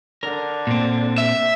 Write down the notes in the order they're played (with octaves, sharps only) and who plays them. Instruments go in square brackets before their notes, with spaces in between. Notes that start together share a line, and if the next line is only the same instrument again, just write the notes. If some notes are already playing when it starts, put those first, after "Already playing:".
[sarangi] D3 [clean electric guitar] A#4
[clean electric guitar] A#2 C4
[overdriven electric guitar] E5